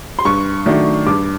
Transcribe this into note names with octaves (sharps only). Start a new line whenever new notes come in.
C6
G2 C#6
D#3 F#3 A3 D4
G2 D6